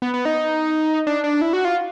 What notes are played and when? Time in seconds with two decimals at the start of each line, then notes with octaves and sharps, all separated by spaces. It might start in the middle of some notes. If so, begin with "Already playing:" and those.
0.02 B3
0.14 B3
0.25 D#4
1.07 D4
1.24 D4
1.41 E4
1.53 F#4
1.65 F4